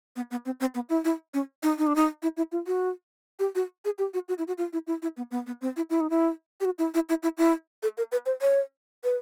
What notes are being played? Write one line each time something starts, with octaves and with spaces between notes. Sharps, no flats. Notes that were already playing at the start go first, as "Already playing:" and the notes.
B3
B3
C4
C4
B3
E4
E4
C#4
D#4
D#4
D4
D#4
E4
E4
F4
F#4
G4
F#4
G#4
G4
F#4
F#4
E4
F#4
F4
E4
E4
E4
B3
B3
B3
C4
E4
E4
D#4
E4
G4
F#4
E4
E4
E4
E4
E4
A4
A#4
B4
C5
C#5
B4